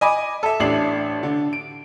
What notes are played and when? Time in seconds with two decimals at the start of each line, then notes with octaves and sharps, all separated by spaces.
0.01 D#5 G#5 B5 D6
0.43 A4 E5
0.60 A1 A3 D4 C7 F#7
1.23 D3
1.53 D7